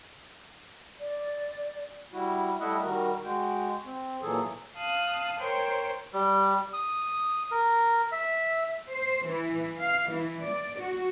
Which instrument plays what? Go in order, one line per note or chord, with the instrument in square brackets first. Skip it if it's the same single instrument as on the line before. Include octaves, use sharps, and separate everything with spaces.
[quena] D5
[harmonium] G3 E4 F#4
G3 A3 E4 D#5 E5 F#5
D#3 G3 F#4 A#4
G#3 F#4 G5
C4
A#2 E3 F#3 G#4 A4
[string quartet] F5 A5 D#6 F#6
A#4 C5 C#5 G5
[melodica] G3
D#6
A#4
E5
[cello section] C5
E3
F5
E3
D5
F#4